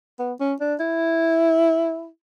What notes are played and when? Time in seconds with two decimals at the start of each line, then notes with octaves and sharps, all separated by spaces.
0.19 B3
0.40 C#4
0.61 D4
0.80 E4